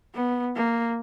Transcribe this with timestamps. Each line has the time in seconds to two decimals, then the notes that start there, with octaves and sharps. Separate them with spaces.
0.15 B3
0.56 A#3